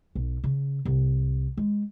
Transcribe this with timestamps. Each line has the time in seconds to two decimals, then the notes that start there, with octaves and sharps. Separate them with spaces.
0.15 B1
0.44 C#3
0.85 C2
1.57 G#3